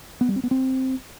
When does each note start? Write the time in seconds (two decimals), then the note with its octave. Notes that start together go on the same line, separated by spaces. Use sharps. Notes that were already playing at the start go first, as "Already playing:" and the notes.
0.21 B3
0.28 G3
0.36 C4
0.43 B3
0.51 C4